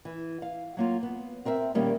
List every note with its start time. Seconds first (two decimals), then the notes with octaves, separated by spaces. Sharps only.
0.05 E3
0.42 F5
0.77 F#3 A#3 F4
1.03 B3
1.45 C4 A#4 C5 E5
1.75 A#2 D#3 G3 A#3 C#4